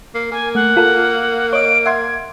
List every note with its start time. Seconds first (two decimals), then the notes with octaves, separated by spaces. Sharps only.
0.15 A#3 C7
0.31 A#3 G#5
0.55 A3 F#5
0.76 F4 A4 A#4
1.53 C#5 D#5 D7
1.86 E5 F#5 C6 G#6